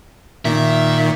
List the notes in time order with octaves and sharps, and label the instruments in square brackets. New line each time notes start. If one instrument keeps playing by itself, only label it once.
[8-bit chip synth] A#2 D#3 [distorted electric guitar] E5